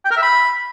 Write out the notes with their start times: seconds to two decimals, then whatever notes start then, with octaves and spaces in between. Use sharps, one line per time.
0.05 G5
0.11 A#4
0.17 E5
0.23 B5